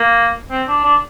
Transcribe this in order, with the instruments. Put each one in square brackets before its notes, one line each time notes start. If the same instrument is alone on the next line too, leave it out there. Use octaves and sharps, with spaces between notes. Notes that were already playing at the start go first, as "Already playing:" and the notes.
Already playing: [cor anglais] A#3
C4
D4
D4